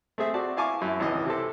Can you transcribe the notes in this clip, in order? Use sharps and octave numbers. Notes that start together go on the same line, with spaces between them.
A3 C4 G#4 E5
C4 F#4 D5 A5
E4 F5 G#5 A5 C#6 D6
F#2 E4
G#1 C#2 E3 D#5
C3 C4 A4